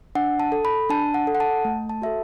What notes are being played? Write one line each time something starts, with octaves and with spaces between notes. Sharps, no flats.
D4 F#5
A5
A4
B5
D4 A5
F#5
A4
F#5
A5
A3
A5
F#4 A4 E5